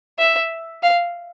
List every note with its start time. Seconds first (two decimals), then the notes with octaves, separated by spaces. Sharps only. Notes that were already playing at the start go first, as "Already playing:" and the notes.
0.19 E5
0.83 F5